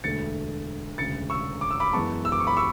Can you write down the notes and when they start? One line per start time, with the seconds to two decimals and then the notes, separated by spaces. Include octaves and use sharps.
0.04 E1 D2 D3 A3 A6 C#7
0.98 E1 D2 C#3 A6 C#7
1.30 C#6 E6
1.61 D6
1.71 E6
1.80 B5 D6
1.93 F#2 E3 G#3 B3 A5 C#6
2.25 E6
2.32 D6
2.40 C#6
2.47 B5 D6
2.57 C#6 E6